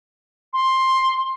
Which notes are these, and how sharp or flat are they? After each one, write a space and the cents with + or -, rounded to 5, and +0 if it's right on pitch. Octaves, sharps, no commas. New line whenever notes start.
C6 +10